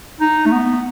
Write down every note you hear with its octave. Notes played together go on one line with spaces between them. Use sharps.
D#4
A3
B3